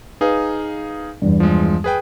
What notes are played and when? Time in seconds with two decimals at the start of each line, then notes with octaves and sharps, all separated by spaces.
0.21 D#4 G#4 B4 F5
1.22 E2 G2
1.40 F3 G#3
1.84 G#4 B4 G5